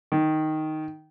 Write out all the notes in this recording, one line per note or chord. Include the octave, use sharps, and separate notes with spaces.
D#3